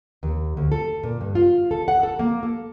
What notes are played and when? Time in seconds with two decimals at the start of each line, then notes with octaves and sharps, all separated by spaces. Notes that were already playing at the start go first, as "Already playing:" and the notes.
0.23 D#2
0.57 D2
0.72 A4
1.03 A#2
1.21 G2
1.35 F4
1.71 A4
1.88 F#5
2.03 A4
2.19 A#3
2.43 A4